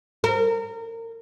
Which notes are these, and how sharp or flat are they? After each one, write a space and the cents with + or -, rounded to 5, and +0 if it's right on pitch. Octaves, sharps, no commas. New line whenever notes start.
A#4 -30